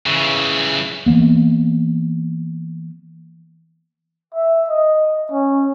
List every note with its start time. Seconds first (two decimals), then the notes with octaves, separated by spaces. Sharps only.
0.06 C#3 E3
1.06 E3 F#3 A#3 B3
4.35 E5
4.69 D#5
5.32 C#4